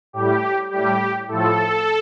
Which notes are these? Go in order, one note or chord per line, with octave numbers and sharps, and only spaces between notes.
A2 G3 G4
A2 G3 G4
A2 F3 A4